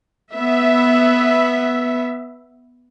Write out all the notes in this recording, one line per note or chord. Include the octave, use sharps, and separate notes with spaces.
B3 E5